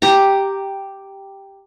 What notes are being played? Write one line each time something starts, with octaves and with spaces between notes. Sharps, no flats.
G4 A#5